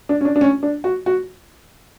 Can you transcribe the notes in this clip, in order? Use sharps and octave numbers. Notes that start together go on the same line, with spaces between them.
D4
C#4
D4
D4
C#4
D4
F#4
F#4